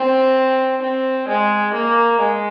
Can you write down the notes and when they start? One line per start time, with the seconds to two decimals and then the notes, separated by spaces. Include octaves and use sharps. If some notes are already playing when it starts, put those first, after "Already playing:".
Already playing: C4
0.81 C4
1.28 G#3
1.73 A#3
2.19 G#3